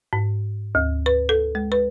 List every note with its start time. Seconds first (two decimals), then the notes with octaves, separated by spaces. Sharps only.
0.13 G#2
0.75 D2
1.06 B4
1.29 A4
1.55 G#3
1.72 B4